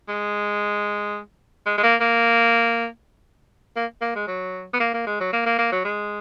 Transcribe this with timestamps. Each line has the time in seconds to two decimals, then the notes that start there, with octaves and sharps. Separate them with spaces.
0.09 G#3
1.66 G#3
1.78 G#3
1.83 A#3
2.01 A#3
3.76 A#3
4.02 A#3
4.16 G#3
4.28 F#3
4.74 B3
4.80 A#3
4.94 A#3
5.07 G#3
5.20 F#3
5.33 A#3
5.46 A#3
5.59 A#3
5.72 F#3
5.85 G#3